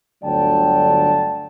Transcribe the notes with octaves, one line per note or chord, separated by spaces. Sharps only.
G1 D2 F#3 D5 G5 A5